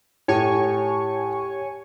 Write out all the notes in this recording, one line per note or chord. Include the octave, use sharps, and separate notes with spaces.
A2 G4 C#5 G#5 C#6